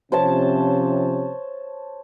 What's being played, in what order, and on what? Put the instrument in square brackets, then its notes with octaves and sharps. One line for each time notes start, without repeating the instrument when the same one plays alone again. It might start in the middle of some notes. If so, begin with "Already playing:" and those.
[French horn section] C3 F3 C#4 [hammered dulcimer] C5 C#5 A5